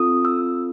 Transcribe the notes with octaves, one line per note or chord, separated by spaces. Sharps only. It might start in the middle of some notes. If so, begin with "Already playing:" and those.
Already playing: C4 F4 A4 D#6
E6